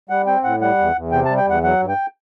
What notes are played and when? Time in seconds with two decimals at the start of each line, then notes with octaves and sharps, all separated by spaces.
0.09 G3 F#5
0.27 C4 G5
0.44 A2 F#5
0.61 G3 F#5
0.79 E2
0.96 E2
1.11 C3 G5
1.25 A5
1.29 G3
1.37 G5
1.46 E2 F#5
1.63 F#3 F#5
1.80 G2
1.89 G5